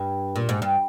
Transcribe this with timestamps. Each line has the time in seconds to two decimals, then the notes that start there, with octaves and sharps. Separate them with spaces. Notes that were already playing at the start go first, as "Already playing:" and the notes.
Already playing: G2
0.36 A#2
0.49 G#2
0.62 G2